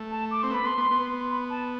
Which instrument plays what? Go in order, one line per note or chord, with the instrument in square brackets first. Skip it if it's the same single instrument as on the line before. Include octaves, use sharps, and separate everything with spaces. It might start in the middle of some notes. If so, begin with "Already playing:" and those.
Already playing: [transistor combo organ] A3
[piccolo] A5
D6
[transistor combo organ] C4 [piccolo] C6
[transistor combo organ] B3 [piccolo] B5
[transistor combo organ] B3 [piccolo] C6
[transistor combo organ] B3
B3
[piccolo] B5
A5